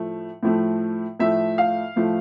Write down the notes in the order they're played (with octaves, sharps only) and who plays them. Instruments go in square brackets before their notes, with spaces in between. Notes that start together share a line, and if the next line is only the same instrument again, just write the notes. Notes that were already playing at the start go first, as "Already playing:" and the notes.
Already playing: [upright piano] A2 F3 A3
A2 F3 A3
A2 F3 A3 E5
F5
A2 F3 A3